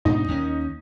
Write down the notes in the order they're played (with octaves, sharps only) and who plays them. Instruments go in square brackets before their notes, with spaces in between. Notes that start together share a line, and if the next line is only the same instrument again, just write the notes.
[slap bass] G#2 B2 D4 [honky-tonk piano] D#4
[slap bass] D#2 G#3 C#4